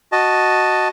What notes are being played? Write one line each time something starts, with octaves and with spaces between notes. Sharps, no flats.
F#4 D#5 A5